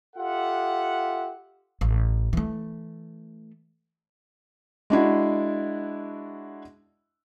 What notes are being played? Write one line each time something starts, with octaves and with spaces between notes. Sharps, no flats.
F4 G4 A4 E5 F#5
A1
E3 A3
G#3 D4 E4 F#4